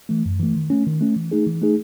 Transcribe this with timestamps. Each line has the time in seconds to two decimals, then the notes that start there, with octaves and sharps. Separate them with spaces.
0.09 E3 A3
0.25 F#2
0.40 E3 A3
0.55 D#3
0.70 A3 C#4
0.87 D#3
1.01 A3 C#4
1.16 E3
1.31 A3 D#4 G#4
1.47 E3
1.62 A3 D#4 G#4